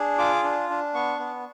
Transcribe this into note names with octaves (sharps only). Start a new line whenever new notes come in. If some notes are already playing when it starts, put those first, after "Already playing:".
Already playing: D4 G#4
F4 D6
D4
D4
B3 C#6
B3